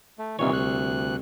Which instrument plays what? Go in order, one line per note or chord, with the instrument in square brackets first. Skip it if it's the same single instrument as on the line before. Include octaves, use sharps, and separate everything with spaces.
[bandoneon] A3
[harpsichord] C2 C#5 [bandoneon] A#2 D#3 E3
[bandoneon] D2 F#6